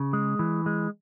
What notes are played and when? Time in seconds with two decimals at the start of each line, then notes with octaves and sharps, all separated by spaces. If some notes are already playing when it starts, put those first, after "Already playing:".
Already playing: C#3
0.13 G#3
0.39 E3
0.66 G#3